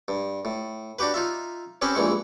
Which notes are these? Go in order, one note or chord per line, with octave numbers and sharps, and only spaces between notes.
G2
A2
D4 F#4 G4 B4
D#4 F4 E5
C4 C#4 G4 B4 C5
A#1 G2 E3 G#3 C#6